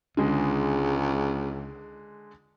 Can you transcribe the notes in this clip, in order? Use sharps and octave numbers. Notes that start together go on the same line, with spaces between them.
C#2 D3 G#3